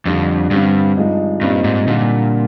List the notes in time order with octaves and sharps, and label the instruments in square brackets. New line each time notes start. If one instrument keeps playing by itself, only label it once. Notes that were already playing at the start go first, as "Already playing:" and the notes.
[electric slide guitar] F2 [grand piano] D3 G3 D4
[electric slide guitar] G2 [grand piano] D3 G3 C4
[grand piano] G2 F3 G#3 D#4
[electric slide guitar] G2 [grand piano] A#2 G3 C4 D#4
[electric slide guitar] G#2
[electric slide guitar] A#2 [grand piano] D3 G3 D4